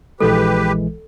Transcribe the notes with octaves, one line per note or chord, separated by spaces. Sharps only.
A#1 E3 G#3 G4 A4 B4